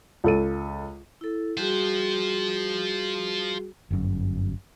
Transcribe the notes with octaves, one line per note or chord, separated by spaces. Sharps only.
C#2 A4 D#7
E4 A4
G3 F4 F#4 G#4 C5
G1 F#2